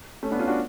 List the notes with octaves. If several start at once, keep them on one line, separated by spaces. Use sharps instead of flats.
A3 C#4
B3 D4
C#4 F4
D4 F#4